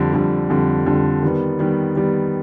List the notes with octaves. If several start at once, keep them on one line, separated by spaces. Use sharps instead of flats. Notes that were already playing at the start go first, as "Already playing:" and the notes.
Already playing: F2 D3 G3
F2 D3 G3
F2 D3 G3
F2 D3 G3
D#3 G3 B3
D#3 G3 B3
D#3 G3 B3